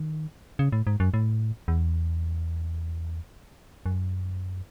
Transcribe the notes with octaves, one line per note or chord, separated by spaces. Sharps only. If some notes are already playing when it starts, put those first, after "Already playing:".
Already playing: D#3
C#3
A2
G#2
F#2
A2
E2
F#2